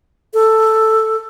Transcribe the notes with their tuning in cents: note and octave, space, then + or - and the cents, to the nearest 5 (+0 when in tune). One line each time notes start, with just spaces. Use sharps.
A4 +5